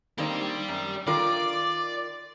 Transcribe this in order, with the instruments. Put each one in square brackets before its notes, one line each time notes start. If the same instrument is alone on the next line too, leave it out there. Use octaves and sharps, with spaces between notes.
[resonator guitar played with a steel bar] D#3 A#3 C4 [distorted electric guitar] G4 D5
[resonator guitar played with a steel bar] F#2
[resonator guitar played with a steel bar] D#3 F4 A#4 [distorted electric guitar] D5 [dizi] D6